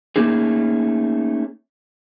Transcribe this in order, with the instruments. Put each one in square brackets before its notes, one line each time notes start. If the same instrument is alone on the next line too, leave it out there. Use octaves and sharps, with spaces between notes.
[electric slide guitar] A3 A#3 C#4 D#4 G#4